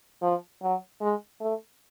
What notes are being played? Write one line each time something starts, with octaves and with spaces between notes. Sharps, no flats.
F3
F#3
G#3
A3